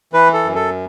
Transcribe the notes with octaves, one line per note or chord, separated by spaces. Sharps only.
E3 B4
A4
F#2
A4